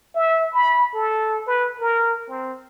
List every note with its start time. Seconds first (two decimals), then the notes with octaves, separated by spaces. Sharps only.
0.15 E5
0.53 B5
0.94 A4
1.47 B4
1.80 A#4
2.29 C4